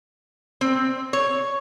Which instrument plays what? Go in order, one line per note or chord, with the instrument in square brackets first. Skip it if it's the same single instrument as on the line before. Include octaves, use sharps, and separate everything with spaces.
[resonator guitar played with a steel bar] C4
C#5